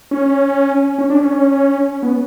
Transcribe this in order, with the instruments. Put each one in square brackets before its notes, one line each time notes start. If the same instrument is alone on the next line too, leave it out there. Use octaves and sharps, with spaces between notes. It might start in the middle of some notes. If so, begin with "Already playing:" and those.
[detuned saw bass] C#4
C#4
D4
C#4
B3